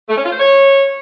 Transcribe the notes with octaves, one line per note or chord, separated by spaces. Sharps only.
A3
C#4
F4
C5
C#5